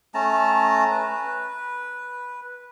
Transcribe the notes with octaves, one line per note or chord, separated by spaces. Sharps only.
A3 C#4 A5 A#5
B4